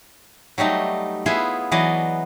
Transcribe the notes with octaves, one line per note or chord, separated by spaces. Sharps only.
F#3 G3 A3 D#4
B3 E4 F4 G#4 E5
E3 F#3 B3 D5 D#5